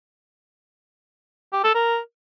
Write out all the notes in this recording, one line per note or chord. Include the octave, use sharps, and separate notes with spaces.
G4
A4
A#4